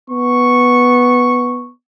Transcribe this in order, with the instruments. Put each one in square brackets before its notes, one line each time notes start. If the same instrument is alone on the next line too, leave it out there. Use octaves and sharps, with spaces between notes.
[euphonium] B3 [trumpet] C#6